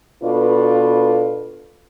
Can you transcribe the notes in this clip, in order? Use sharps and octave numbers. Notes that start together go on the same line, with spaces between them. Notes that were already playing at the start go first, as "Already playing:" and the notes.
B2 D4 F4 A4 B4